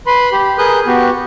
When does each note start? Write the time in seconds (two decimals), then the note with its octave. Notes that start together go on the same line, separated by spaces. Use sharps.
0.07 B4 B5 C6
0.32 G4
0.58 G#4 A#4 B4 D#6 F#6 G6
0.87 B3 F#4 G4